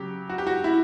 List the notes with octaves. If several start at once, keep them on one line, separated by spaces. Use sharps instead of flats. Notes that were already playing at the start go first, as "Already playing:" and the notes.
Already playing: C#3 F#3 G4
F#4
G4
F#4
E4